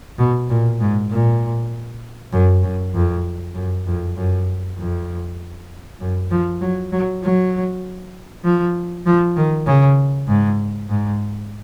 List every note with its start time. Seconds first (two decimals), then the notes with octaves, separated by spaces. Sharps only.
0.18 B2
0.49 A#2
0.80 G#2
1.10 A#2
2.32 F#2
2.63 F#2
2.94 F2
3.55 F#2
3.86 F2
4.16 F#2
4.78 F2
6.00 F#2
6.31 F3
6.61 F#3
6.92 F#3
7.23 F#3
8.44 F3
9.06 F3
9.36 D#3
9.66 C#3
10.28 G#2
10.89 G#2